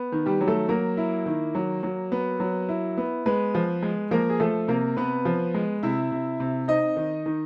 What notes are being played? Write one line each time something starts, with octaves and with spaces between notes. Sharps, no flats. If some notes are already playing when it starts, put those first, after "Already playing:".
Already playing: B3
D#3
G3 G4
F#3
A3 A4
F#3 A#3 A#4
E4
D#3
F#3
F#3
B3
F#3
E4
B3
G#3 B3 B4
F3
G#3
F3 A#3 A#4
G#4
F3 A3 A4
C3 A#3 A#4
C3 B3 B4
F3
G#3
C3 E4 E5
C3
C3
C4 D#4 D#5
D#3
D#3